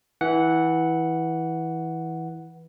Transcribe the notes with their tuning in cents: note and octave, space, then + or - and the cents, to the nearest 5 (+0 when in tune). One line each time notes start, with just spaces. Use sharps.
E3 -15 F#5 +0